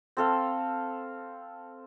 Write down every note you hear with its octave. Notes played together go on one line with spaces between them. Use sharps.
C4 A4 F5